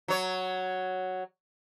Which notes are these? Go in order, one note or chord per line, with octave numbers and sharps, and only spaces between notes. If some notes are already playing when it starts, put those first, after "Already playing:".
F#3 C#5